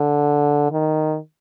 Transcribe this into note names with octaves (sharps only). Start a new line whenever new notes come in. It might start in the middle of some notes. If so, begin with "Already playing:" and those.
Already playing: D3
D#3